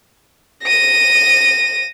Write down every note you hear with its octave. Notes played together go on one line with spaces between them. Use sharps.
A#6 D#7